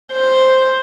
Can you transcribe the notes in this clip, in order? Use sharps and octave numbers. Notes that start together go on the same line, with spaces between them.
C5